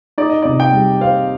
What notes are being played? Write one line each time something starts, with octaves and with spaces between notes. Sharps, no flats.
D#4 D5
D#5
C3 D5
G5
G3
C4 F5